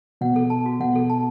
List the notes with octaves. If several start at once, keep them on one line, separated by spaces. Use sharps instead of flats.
B2 F#5
A4
A5
F#4
B2 F#5
A4
A5